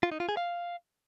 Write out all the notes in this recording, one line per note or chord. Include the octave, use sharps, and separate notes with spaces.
F4
D#4
F4
G#4
F5